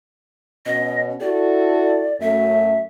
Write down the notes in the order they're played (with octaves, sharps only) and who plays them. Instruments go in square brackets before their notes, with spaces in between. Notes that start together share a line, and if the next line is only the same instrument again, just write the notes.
[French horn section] B2 C#4 [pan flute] D#5
[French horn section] E4 F#4 A4 [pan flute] D5
[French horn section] F#2 A3 [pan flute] E5